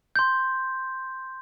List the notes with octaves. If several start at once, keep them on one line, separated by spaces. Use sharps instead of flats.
C6 G6